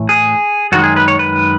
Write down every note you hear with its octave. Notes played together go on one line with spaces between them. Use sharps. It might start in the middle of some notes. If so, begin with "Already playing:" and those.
Already playing: A2 E3 A3
G#4
F#2 D#3 G#3 F#4
G#4
B4
C#5
B4